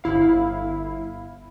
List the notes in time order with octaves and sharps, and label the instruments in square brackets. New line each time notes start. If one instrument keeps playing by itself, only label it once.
[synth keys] G1 E4 F5